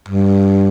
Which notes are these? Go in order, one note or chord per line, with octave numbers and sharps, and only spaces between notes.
G2